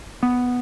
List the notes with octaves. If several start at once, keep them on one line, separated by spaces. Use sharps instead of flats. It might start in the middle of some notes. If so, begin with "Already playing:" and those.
B3